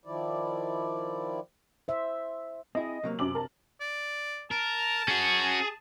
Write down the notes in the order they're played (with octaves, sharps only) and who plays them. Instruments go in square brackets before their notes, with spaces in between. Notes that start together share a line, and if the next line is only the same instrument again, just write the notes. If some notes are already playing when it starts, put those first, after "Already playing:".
[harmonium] D#3 F3 E4 D5
[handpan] C5 E5
[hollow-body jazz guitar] C4 E4 G#4 [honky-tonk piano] D#5
[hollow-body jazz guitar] C3 F#3 A#3
[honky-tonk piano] F#2 D6 F#7 [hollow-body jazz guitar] C3
[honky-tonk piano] A#4 A5
[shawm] D5
[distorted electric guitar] A#4 [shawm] A5
[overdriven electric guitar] C#4 F#4 [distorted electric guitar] G#4